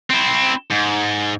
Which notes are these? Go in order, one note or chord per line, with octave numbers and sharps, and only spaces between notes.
C4 E4
G#2